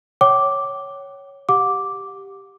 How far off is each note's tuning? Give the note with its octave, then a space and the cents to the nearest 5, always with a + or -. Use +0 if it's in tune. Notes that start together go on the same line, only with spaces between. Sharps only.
C#5 +0 G5 -45 D6 +0
G4 +0 F#5 -30 D6 +0